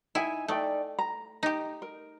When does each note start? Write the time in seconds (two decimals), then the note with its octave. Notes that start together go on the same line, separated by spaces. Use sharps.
0.15 D#4 E4 E5 G#5
0.48 A3 D#4 D5 G5
0.99 A#5
1.43 D#4 G4
1.82 A#4